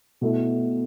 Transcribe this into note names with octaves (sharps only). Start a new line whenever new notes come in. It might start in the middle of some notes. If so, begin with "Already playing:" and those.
B2 A3 E4